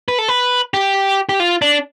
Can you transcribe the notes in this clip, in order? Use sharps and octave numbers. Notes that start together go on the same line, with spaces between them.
B4
A4
B4
G4
G4
F4
D4